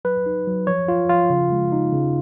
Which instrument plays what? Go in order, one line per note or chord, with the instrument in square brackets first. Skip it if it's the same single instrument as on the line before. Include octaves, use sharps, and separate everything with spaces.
[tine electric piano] F#3 B4
D#4
F#3
F3 C#5
F4
F3 F4
C#3
G#3
D#4
C#3